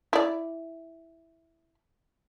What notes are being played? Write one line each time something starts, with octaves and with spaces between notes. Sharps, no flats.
E4 D5